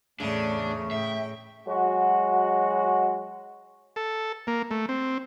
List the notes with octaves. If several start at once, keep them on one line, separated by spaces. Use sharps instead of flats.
E2 A2 C#3 A3 D4 D5
A2 E5 G5
F#3 G#3 F#4
A4
A#3
A3
C4